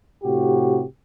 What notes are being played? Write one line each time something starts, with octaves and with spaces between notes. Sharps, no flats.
A2 C3 F#4 G4